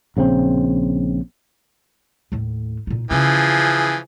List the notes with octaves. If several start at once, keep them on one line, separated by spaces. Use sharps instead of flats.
A#1 C#3 F3 C4
D#2 A2
A#2 D#4
C#3 E3 F3 C#4 G#4